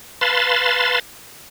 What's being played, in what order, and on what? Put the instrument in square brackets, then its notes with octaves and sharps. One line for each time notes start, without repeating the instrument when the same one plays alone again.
[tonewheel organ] B4 F5 A5 B5 C6 A6